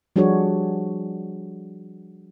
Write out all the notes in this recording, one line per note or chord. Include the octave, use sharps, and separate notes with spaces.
F3 G3 D4 F#4 G#4 C#5